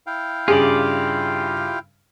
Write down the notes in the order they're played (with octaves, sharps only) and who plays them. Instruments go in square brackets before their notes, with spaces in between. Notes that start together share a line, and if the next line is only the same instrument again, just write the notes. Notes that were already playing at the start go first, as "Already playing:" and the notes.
[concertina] E4 F5 G5
[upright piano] G2 C#3 [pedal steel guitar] F4 G4 D5 [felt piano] G#4